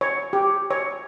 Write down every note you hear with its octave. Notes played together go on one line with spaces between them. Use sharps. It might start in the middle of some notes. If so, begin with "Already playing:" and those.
C#5
G4
C#5